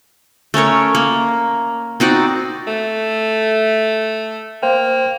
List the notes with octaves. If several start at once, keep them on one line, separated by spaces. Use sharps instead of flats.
A3 C#4 A#4 C#5
A#3
C4 D#4 F#4 D5
A3
A#3 C5 G5